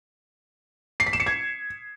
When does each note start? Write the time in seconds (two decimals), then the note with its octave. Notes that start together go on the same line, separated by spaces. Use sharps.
1.00 C7
1.06 B6
1.13 E7
1.20 C#7
1.26 G#6